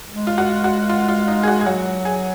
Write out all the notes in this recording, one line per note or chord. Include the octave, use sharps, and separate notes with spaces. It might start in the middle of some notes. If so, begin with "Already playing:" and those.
G#3
F4
F#4
F#4
F4
F4
D#4
G#4
F#4
G#4
F#3 F#4
G#4